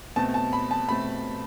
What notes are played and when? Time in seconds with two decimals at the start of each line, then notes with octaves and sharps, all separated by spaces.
0.16 B2 A3 C4 A5
0.34 A5
0.53 B5
0.71 A5
0.89 B2 A3 C4 B5